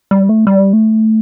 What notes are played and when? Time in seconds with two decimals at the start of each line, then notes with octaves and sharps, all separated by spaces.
0.11 G3
0.29 A3
0.47 G3
0.73 A3